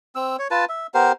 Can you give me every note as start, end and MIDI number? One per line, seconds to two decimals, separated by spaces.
0.15 0.36 60
0.15 0.36 88
0.39 0.48 73
0.51 0.65 65
0.51 0.65 71
0.51 0.65 81
0.69 0.87 76
0.94 1.12 59
0.94 1.12 67
0.94 1.12 70
0.94 1.12 72